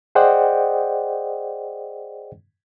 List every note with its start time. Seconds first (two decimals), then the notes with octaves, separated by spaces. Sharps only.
0.15 G#4 C5 D5 D#5 F#5 G5